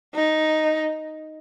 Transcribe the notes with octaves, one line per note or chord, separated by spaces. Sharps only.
D#4